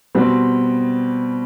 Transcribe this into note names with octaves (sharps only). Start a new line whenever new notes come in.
B2 G3 C4